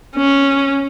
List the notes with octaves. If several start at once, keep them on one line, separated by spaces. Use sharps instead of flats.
C#4